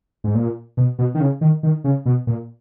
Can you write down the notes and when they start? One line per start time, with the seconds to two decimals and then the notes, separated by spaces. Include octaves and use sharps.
0.24 G#2
0.35 A#2
0.77 B2
0.99 B2
1.15 D#3
1.20 C#3
1.41 D#3
1.63 D#3
1.84 C#3
2.06 B2
2.27 A#2